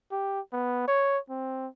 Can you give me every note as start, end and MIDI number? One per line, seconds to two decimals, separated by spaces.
0.11 0.40 67
0.53 0.87 59
0.88 1.18 73
1.29 1.68 60